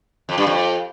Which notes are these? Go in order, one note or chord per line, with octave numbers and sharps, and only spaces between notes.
F2
G2
F2